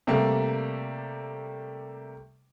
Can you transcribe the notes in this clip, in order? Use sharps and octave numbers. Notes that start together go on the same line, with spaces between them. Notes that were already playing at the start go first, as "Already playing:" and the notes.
C3 G3 A3 A#3